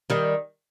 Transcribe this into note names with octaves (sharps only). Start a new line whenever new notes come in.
D#3 G3